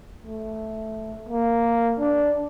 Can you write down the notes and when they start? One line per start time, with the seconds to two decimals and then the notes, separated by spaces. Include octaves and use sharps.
0.23 A3
1.29 A#3
2.00 D4